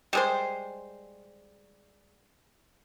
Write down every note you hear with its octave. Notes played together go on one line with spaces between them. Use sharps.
G3 G#3 C5